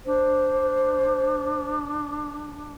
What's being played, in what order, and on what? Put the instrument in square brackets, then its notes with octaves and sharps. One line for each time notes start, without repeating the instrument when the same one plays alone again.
[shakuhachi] D4 [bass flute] C5